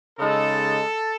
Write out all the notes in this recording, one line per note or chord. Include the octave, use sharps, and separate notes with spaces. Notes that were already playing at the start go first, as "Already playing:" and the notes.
C#3 G#3 D#4 A4